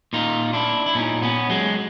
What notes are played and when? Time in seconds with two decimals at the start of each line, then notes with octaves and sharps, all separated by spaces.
0.13 A#2 D#4 F4
0.53 D4 E4
0.86 E4
0.95 A#2 C#4 D#4
1.22 B3 C#4
1.50 F#3 G#3